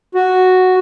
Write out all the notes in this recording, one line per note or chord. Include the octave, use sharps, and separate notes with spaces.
F#4